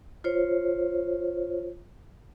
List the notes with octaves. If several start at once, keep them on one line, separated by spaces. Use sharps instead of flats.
F4 C5 C#5